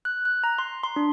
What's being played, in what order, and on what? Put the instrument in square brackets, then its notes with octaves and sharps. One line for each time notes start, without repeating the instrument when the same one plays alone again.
[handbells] F#6
F#6
A#5
C6
C6
D4